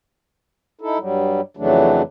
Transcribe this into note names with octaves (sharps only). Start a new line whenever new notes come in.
D#4 E4 A4
G2 F#3 G3
F2 C#3 E3 F#3 A3 D4